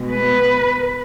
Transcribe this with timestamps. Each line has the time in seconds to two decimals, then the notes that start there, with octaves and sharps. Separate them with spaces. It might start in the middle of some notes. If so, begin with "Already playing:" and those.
Already playing: B2 G#3
0.12 B4